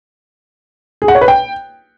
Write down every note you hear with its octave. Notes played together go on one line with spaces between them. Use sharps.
G#4
F#5
C#5
B4
G5